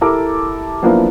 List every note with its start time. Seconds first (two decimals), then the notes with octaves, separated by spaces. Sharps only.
0.01 E4 G4 A4 A#4 A5 D6
0.83 F3 F#3 A#3 B3 D4 E4